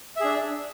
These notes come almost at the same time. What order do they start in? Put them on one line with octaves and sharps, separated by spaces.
E5 G#4 D4